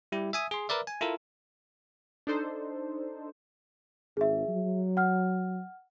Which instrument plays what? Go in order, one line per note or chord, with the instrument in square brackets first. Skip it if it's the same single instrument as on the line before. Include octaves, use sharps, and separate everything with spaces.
[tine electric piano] G3 E4 G4
E5 G#5 D#6
G#4 C6
A#4 B4 D5 E5
G#5
E4 F4 A4 A#4
[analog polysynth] D4 D#4 A4 C5
[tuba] G#1 [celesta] G#4 E5
[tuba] F#3
[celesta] F#5 F6